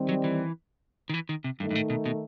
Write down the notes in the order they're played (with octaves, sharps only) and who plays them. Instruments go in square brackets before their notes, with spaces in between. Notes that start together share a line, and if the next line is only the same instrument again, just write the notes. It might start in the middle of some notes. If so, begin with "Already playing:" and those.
Already playing: [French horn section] D#3 G3 C4
[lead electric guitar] F#3
E3
D#3
E3
D#3
C3
[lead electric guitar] G2 [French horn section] D#3 A3 D#4
[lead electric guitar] G2
A2
B2
B2